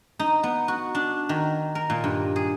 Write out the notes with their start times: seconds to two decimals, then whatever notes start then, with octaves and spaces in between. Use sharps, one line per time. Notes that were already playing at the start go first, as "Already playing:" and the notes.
0.19 D#4
0.43 B3
0.68 F#4
0.95 D4
1.29 D#3
1.75 A#4
1.90 A#2
2.04 G2
2.36 G#4